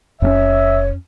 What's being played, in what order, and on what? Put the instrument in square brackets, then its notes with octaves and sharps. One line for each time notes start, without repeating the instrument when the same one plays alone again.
[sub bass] E1 [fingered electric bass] F2 A#3 C#4 [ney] C#5 [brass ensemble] E5